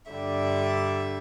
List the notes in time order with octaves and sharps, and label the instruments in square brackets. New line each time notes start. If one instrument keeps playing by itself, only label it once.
[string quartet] G2 D3 G3 E5